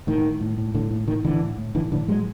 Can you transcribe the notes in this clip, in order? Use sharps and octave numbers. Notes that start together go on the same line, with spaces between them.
A2 D#3
A2
A2
A2
A2 D3
A2
A2 D#3
A2 D3 E3
A2
A2
A2 D3 E3
A2 D3 E3
A2 F#3 G#3